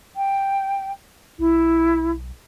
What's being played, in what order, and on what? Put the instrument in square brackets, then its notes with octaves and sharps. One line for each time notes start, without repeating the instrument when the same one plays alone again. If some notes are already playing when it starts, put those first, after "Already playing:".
[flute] G5
[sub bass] B1 [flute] E4